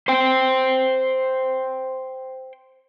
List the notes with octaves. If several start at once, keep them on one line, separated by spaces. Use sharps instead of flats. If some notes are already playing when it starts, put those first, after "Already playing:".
C5 G5